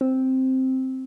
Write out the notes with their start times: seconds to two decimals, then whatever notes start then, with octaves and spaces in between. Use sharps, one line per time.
0.01 C4